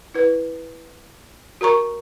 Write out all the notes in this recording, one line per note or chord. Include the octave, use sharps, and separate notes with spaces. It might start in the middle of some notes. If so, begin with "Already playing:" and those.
E4 B4
F#4 A#4 A#5 C#6